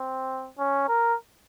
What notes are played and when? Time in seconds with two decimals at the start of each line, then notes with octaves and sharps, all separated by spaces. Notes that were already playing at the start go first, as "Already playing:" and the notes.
Already playing: C4
0.59 C#4
0.88 A#4